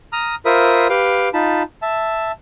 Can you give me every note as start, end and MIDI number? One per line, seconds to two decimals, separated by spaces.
0.13 0.35 82
0.13 0.35 87
0.13 0.35 89
0.45 0.87 65
0.45 0.87 70
0.45 0.87 72
0.45 0.87 76
0.45 0.87 83
0.45 0.87 87
0.89 1.29 67
0.89 1.29 71
0.89 1.29 77
0.89 1.29 79
1.34 1.63 63
1.34 1.63 65
1.34 1.63 81
1.34 1.63 83
1.82 2.32 76
1.82 2.32 81